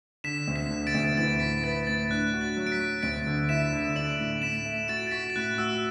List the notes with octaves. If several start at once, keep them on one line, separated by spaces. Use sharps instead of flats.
D3 B6 E7
D2
B6 E7
D3
A6 D7
D2
E3 A6
A2 B6
B4 A6
A2 A6
D4 F#6
F#4
A6
F#3
D7
B6
F#4
D2 A6 D7
D3
E4 B6 E7
D3
D4 D7 F#7
A2
A2 B6 E7
A3
F#4 A6 D7
A6
F#4 B6
A6
A2 F#6
F#4 E6